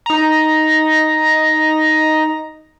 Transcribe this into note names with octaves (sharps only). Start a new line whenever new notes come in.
D#4 A#5